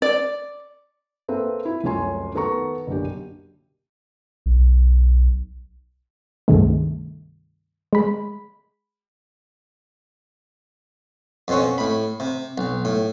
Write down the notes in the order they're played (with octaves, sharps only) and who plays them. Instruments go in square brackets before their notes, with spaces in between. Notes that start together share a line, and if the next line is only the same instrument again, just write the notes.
[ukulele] D5
[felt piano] A#3 C4 A4 B4 E5
E4
F1 C#2 F#2 C#5 G#5 C6
D#3 B3 A4 A#5 C#6
F#1 B1 D3 G4
[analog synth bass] B1
[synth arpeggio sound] C#2 G2 C3 D#3 G#3 A3
G#3 B5
[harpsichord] F2 B2 C4 C#4
A2 B5
C3
B1
A2